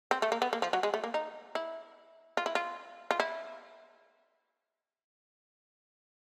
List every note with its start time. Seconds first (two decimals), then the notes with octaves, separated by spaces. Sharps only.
0.11 C4
0.22 A3
0.32 A#3
0.42 B3
0.53 A#3
0.62 F3
0.73 F#3
0.83 G#3
0.94 A3
1.04 A#3
1.14 D#4
1.55 E4
2.37 F4
2.46 E4
2.55 F4
3.11 F4
3.20 E4